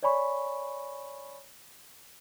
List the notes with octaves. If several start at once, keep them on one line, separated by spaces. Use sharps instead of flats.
C#5 D5 G#5 B5 C#6